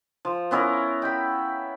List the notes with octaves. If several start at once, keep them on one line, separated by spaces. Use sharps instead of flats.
F3
B3 C#4 E4 A#4
G5 B5